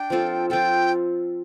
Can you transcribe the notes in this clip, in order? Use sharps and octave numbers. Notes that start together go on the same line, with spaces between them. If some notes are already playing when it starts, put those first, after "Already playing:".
Already playing: D4 G5
F3 C4 F4 A4
F3 C4 F4 A4 G5